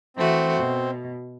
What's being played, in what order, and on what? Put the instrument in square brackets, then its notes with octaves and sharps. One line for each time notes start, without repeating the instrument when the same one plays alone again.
[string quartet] E3 A3 F#4 [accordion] C4
[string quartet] B2